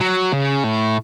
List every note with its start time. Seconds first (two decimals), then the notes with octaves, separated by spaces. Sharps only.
0.01 F#3
0.33 C#3
0.64 A2